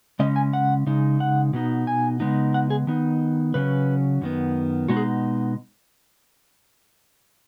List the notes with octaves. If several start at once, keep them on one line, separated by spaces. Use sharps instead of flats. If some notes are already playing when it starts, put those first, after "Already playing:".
C#3 G#3 C#4 D#5
G#5
F#5
C#3 G#3 D#4
F#5
B2 B3 D#4
G#5
C#3 G#3 B3 D#4
F#5
G#4
D#3 B3 D#4
C#3 F#3 C#4 B4
F#2 D#3 B3
B2 G#3 B3 D#4 F#4
G#4